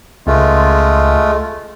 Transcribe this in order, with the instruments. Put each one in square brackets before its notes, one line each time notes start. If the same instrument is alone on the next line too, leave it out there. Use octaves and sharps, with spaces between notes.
[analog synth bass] C#2 [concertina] G#3 A3 F4